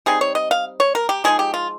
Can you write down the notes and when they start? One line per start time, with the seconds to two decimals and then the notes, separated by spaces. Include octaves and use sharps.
0.06 G3 C4 D#4 G#4
0.21 C#5
0.35 D#5
0.51 F5
0.80 C#5
0.95 A#4
1.09 G4
1.24 F3 G#3 C4 D#4 G#4
1.39 G4
1.54 F4